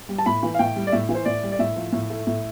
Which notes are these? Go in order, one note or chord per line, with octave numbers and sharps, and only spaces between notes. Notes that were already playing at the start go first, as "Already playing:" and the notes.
G3
A5
A2 B5
E3
F5
A2 G5
G3
D5
A2 E5
E3
C5
A2 D5
G3
D5
A2 E5
F3
A2
A3
A2